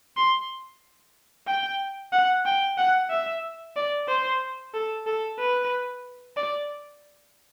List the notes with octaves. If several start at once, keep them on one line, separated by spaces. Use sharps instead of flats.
C6
G5
F#5
G5
F#5
E5
D5
C5
A4
A4
B4
D5